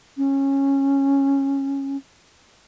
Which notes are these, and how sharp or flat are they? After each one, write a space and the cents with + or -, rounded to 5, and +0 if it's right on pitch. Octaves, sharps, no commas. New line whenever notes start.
C#4 -15